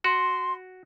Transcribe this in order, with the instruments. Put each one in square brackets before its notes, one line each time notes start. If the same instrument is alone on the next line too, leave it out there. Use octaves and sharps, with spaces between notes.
[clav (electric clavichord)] F#4 [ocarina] C6